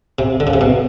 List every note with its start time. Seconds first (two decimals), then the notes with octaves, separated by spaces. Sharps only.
0.19 C3
0.40 D3
0.47 C#3
0.54 C3
0.61 B2